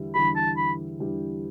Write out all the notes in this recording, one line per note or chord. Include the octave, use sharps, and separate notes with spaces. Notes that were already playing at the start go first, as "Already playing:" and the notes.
Already playing: E2 D3 G3 E4 G4
E2 D3 G3 E4 G4 B5
A5
B5
E2 D3 G3 E4 G4